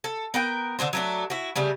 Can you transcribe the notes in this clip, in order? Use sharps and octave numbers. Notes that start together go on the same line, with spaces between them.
A4
B3 A#4 G5
D3 C4 D4 C5
F#3 A3 D4
E4 F#4
C#3 G3 A3